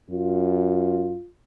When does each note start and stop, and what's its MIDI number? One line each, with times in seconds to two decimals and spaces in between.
0.10 1.16 42
0.10 1.29 65